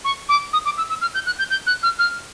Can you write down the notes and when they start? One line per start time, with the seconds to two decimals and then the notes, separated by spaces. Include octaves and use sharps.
0.04 C#6
0.29 D6
0.53 D#6
0.65 D6
0.78 E6
0.90 E6
1.02 F6
1.14 G6
1.26 F#6
1.39 G6
1.50 G6
1.67 F#6
1.83 F6
1.99 F6